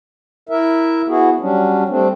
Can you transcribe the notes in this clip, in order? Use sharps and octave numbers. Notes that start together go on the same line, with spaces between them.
E4 A#4 E5
B3 E4 F#4 G#4
F#3 G3 C#4 D4
G3 A3 C4 D4